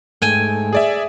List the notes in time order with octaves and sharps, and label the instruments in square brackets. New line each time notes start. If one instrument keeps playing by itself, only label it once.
[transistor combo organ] G#2 A3 [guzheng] G5 G#5
[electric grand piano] G#4 D5 E5